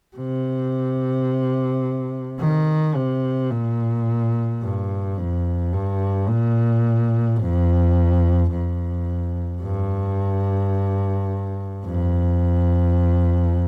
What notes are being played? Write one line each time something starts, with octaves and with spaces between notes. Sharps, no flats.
C3
D#3
C3
A#2
G2
F2
G2
A#2
F2
F2
G2
F2